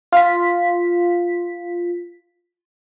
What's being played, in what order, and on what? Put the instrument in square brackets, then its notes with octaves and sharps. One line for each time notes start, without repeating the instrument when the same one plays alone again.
[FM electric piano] F4 B6